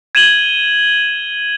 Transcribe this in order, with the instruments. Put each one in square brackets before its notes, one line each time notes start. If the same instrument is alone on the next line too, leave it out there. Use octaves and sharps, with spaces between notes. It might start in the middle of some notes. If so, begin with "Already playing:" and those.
[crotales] G#6 D#7 E7 F#7 G7